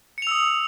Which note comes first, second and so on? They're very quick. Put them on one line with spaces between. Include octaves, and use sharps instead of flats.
C#7 F7 E6 D#6